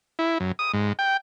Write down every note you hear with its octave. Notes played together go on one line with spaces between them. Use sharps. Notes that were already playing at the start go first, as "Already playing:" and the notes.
E4
F#2
D#6
G#2
G5